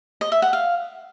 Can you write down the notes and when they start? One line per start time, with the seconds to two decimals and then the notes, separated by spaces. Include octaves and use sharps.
0.21 D#5
0.32 E5
0.42 F#5
0.53 F5